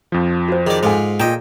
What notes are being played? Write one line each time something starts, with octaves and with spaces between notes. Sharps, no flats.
F2 F3
F#4 C5
D#3 G#4 D5
G#2 F4 G#4 A4 G#5
A#2 F4 D#5 G5 A#5